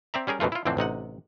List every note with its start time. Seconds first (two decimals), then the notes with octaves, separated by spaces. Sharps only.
0.14 C4 D5 E5 A#5
0.27 G3 C#4 G#4 A#4
0.40 F#2 B2 E3 A3 F4
0.52 E4 F4
0.65 F2 A2 D3 E3 C4 D4
0.77 A1 C3 D#4 F#5